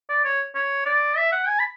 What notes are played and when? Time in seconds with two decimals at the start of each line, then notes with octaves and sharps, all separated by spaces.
0.09 D5
0.25 C#5
0.55 C#5
0.86 D5
1.17 E5
1.32 F#5
1.47 G#5
1.59 B5